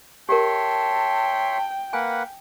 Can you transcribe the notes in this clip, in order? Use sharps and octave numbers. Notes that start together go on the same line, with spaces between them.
G4 A#4 C#5 E5 G5 A5 C6
A#3 B4 F#5 G#5